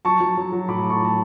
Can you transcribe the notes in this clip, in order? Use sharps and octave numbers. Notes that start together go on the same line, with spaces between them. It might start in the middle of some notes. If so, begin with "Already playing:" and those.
F#3 A5 C#6
F#3
F#3
F#3
A2 B5 D6
A2
A5 C#6
F#3 A5